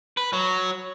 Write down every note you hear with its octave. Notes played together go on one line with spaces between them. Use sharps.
B4
F#3